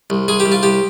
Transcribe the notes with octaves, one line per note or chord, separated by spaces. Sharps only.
C2
C2 G#4
G4
C2
F4
C2 G4